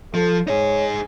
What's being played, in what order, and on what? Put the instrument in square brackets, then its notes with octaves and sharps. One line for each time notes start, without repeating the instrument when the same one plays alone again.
[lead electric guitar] F3 [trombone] A4
[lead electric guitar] D#4 G#4 [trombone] C#5